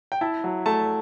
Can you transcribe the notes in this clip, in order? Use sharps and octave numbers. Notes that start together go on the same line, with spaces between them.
G5
E4 A5
F#3
A3 A5